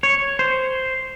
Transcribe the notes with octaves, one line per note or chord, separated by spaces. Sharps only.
C#5
C5